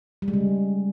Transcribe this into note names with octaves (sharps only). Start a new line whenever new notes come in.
G3
G#3
C#3